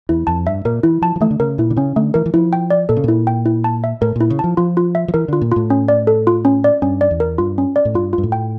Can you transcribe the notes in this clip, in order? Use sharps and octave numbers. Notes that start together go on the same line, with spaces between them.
E2 E4
F2 A5
G2 E5
A#2 A#4
E3 E4
F3 A5
F3
E3 A3
D3
C#3 A#4
A#2 E4
D3
C#3 C#4
D3 A3
E3 A#4
E3
F3 E4
G5
D5
A#2 A4
C#3
A#2 E4
G5
E4
A5
E5
A2 A#4
A#2 E4
C#3
F3 A5
F3 F4
F4
E5
F3
E3 A#4
D3 F4
A#2
A2 F4
C#4
D5
A4
F4
C#4
D5
G2 C#4
D5
E2
A#4
G2 F4
C#4
D5
A2
G2 F4
F4
G2
A2
G5